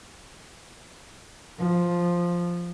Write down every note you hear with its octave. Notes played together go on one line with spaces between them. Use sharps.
F3